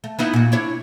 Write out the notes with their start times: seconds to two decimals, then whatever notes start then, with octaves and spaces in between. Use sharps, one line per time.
0.04 A3
0.19 B3 D#4 E4
0.33 A#2 F#4
0.52 D4 E4 C#5